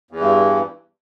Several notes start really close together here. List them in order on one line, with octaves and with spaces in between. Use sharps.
E2 E3 G2